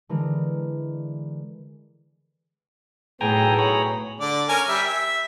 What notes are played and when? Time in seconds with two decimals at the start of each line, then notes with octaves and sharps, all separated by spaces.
0.09 D3 E3 G#3 A#4
3.21 B1 A2 B3 G#4 G5 G#5 A#5
3.59 C#5 A#5 B5
4.20 D3 D5
4.49 C#4 A#4 G#5
4.68 G3 E5
4.88 E5